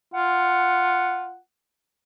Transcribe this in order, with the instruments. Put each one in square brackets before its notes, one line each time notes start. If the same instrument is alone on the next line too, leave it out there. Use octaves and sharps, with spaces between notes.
[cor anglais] F4 [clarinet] F#5